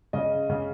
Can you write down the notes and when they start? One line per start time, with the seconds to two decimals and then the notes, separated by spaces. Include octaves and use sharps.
0.13 C#3 D#5
0.50 C#3